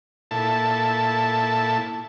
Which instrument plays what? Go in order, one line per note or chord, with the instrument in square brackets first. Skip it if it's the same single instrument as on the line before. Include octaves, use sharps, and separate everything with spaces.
[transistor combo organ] A#2 E4 A4 A5